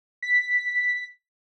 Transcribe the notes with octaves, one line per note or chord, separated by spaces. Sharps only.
B6